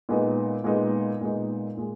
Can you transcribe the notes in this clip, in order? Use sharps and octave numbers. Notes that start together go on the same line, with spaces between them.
A#2 G#3 B3 D#4
A#2 G#3 B3 D#4
A#2 G#3 B3 D#4
A#2 G#3